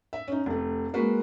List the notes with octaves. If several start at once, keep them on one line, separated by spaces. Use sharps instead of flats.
E5
C#4 D#4
F1 A3
G#3 A#3 F#4 B4